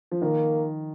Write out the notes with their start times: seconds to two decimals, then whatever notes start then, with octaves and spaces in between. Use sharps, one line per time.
0.12 F3
0.22 D#3 A#3